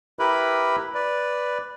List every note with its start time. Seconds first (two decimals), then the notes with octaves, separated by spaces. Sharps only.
0.19 E4 G4 A#4 B4 B5
0.94 B4 D5